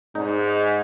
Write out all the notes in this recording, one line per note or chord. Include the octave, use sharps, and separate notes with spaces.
G#2 D#4